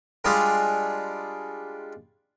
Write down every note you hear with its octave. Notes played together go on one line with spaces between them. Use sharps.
G3 G#3 D4 F4 G#4